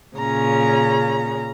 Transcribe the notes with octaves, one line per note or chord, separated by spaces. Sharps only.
A#2 C#3 C#4 A#5